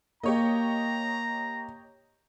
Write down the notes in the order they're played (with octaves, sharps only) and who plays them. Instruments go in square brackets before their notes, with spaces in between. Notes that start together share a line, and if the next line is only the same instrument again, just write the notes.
[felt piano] A#3 [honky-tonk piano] G4 C#5 D#5 [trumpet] A#5